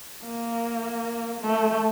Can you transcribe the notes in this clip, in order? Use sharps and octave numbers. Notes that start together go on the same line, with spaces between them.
A#3
A3